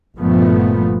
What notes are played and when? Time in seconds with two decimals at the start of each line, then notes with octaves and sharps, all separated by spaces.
0.18 G1 A#2 F3 A3 B3